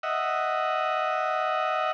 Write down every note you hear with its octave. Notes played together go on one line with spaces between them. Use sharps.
D#5 E5 F#5